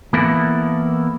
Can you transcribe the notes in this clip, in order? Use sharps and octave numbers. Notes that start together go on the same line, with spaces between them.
E3 A#3 B3 E4 A4 A#4